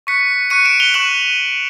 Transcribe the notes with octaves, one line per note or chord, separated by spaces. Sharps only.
C#6 F#6 B6 C#7
C#6 F#6 C#7 D#7
D7 E7
F7 G7
C#6 F#6 E7 F#7